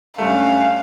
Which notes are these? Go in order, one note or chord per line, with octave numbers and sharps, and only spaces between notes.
G2 G3 A3 C#4 F5